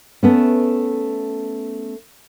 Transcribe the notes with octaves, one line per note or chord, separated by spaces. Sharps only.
A3 B3 C#4